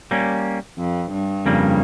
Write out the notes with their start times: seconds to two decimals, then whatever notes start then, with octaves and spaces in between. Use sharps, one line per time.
0.11 G3 A#3 C#4
0.78 F2
1.12 G2
1.46 F2 C#3 G3 A#3